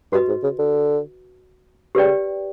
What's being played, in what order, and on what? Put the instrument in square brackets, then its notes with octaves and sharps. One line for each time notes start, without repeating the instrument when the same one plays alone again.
[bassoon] G2 [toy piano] F#4 B4 D#5
[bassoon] G#2
C#3
D3
[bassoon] C#3 [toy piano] G4 B4 D5 G5